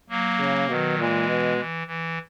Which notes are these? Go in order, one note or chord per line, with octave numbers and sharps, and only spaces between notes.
F#3 A#3
C#3
B2 D#3 F#3
A#2 E3 G#3
B2
E3
E3